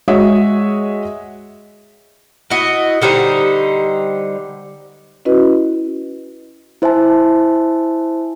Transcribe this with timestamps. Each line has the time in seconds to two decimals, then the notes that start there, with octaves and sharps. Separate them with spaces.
0.08 G#3 F#4 G#4 C#5 D#5 E5
2.50 E4 F#4 D#5
3.02 D3 G3 D#4 C5
5.25 C#4 E4 F#4 B4 D#5
6.82 E4 C5 E5 G#5 A5